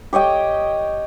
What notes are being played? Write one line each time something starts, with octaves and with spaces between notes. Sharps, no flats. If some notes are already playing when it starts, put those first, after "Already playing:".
G4 C#5 D#5 G5